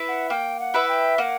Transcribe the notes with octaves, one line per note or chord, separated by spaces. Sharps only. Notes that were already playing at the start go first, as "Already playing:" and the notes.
Already playing: E4 B4 E5
F#5
A#3 G5
F#5
E4 B4 E5
G5
A#3 F#5